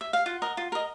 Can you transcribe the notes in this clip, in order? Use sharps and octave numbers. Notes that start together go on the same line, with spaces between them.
E5
F5
F4 F#5
A#4 D#5
F4
A#4 D#5